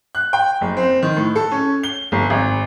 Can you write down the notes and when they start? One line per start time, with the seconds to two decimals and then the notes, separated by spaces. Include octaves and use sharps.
0.15 F#6
0.33 G5
0.61 F#1
0.77 C4
1.03 D#3
1.17 A2
1.35 A4
1.52 C#4
1.83 G7
2.12 G1
2.30 G#1